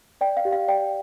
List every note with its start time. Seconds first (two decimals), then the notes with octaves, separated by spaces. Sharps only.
0.21 D5 G5
0.37 F5
0.45 G4
0.53 F5
0.68 D5 G5